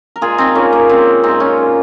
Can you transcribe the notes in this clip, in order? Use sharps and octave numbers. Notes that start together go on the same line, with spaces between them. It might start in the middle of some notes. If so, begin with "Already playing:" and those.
A#4
A#2 G#3 F4 G#4
C4 D#4
A#2 G#3 A#3 C#4
A#3
A#2 G#3 C4
A#2 G#3 C4 D#4
C#4 F4
A#2 F#3